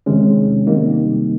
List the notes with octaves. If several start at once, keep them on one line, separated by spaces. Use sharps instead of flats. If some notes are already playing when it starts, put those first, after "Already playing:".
E2 C3 D#3 G#3 C#4
C3 D#3 G3 A#3 D#4